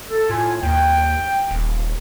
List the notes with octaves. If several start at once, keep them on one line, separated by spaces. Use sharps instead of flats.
A4
A2 F4 G#5
D#2 G5
D#1